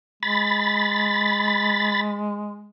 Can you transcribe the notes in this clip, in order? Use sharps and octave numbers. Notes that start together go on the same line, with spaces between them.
G#3 B5 A6